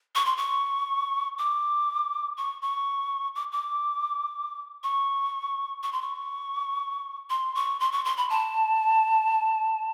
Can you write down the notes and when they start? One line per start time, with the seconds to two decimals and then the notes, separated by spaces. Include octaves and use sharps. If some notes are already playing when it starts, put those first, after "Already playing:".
0.15 C#6
0.25 C6
0.37 C#6
1.38 D6
2.37 C#6
2.62 C#6
3.35 D6
3.52 D6
4.83 C#6
5.83 C#6
5.92 C6
6.02 C#6
7.30 C6
7.55 C#6
7.80 C6
7.92 C#6
8.05 C6
8.17 B5
8.30 A5